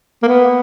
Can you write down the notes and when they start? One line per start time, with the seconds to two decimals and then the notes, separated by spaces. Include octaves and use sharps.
0.23 A#3
0.28 B3